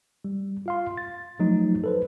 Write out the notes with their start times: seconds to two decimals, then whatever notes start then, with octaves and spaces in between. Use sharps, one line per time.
0.24 G3
0.66 F4 F5 C6
0.97 A6
1.40 F3 F#3 A3 D#4
1.84 A4 B4 C5